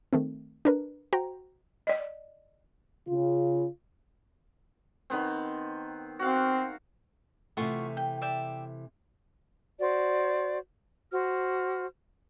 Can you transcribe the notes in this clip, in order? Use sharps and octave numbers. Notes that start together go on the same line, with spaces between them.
D#3 A3 C4
D4 A#4 B4
F#4 C5 G5 A#5
D5 D#5
C#3 F4
D#3 B3 C4
C4 F#4 F5
C3 E3 A3 F4 F#5 C#6
G5
D5 E5 G5
F#4 C5 D5
F#4 C5 F6